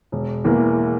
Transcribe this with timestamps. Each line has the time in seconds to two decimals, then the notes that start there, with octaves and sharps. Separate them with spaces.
0.12 E1
0.44 E2 E3 A#3